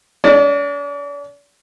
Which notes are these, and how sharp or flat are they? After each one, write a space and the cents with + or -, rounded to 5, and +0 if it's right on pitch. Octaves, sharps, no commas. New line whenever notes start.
D4 -45 D5 +35